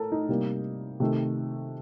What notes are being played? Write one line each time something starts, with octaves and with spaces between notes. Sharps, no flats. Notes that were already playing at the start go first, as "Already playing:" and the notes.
Already playing: A2 A4 A#4
D#4
C3 G3 A#3
C3 D#3 A3